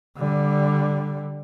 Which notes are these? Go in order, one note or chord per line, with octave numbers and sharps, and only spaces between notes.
D3 G3